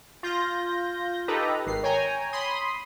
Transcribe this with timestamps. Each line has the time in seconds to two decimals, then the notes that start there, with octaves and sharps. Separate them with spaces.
0.23 F4 G6 A#6
1.28 D#4 G4 A4 B4 D#5 A#5
1.66 G#1 D#3 C7
1.83 C#5 G5 G#5 A#5
2.33 B5 C6 D#6